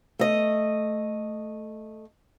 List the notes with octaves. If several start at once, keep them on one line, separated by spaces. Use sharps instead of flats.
A3 D#5